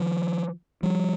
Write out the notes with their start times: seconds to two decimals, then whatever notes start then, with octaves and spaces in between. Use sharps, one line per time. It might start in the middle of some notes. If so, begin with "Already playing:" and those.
Already playing: D#3 F3
0.83 F3 G3